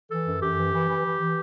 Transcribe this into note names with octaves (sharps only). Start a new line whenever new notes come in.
E3 A4
F#2
F#2 G4
E3
E3
E3
E3
E3